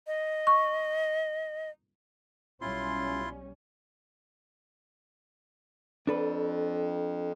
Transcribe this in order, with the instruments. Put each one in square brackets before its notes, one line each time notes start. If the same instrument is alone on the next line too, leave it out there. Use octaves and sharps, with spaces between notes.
[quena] D#5
[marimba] C#6
[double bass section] B1 G3 C#4 [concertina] E4 F4 C6
[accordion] F2 [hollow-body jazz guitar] D4 A4 B4